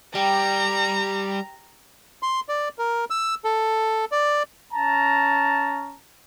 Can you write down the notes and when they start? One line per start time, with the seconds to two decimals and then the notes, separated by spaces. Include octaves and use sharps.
0.15 G3 G4 A#5
2.23 C6
2.49 D5
2.79 A#4
3.10 E6
3.45 A4
4.12 D5
4.73 C#4 A5 A#5